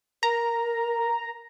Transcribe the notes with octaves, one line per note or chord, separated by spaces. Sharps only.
A#4 A#5